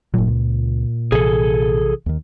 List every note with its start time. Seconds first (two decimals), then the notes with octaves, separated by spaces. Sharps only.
0.14 G1 A#2 F#3
0.27 C#2
1.12 A#1 C3 E3 G#4 A4
2.06 D#2 D#3